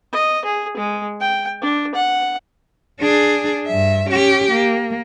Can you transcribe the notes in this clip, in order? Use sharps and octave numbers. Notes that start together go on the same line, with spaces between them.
D#5
G#4
G#3
G5
D4
F#5
D4 G#4
G2 E5
C#4 G4
A#3